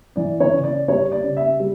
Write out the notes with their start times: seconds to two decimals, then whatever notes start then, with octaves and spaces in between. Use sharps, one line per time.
0.16 E3 D5
0.40 C#5
0.52 C#3
0.64 D5
0.88 G3 C#5
1.12 D5
1.24 C#3
1.37 E5
1.60 G3